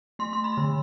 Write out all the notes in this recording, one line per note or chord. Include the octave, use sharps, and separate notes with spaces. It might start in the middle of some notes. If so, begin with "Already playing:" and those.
A3 C6
C6
B5
D3